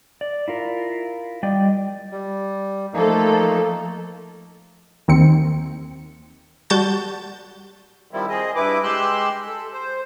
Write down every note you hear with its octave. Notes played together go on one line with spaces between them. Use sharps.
D5
E4 F4 A#4
G3 D5 D#5 G5
G3
F3 A3 A#3 D#4 A4
D#2 D#3 C4 C#7
G3 F#4 A5 G6 A6
D#3 F3 G3 C4 E4
C4 G#4 D#5
G2 E4 B4 D6
G#3 G4 C6 E6 F#6
A4
C5